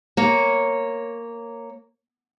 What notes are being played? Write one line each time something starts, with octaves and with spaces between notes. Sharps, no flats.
A#3 C#5